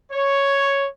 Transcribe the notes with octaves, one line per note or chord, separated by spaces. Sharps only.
C#5